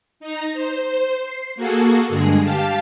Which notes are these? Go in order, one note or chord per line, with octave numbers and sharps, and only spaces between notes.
D#4 A#5
C5
C7
A#3 F#4 G#4 A4
G2 D3 G#3 G#4
G4 F5 A5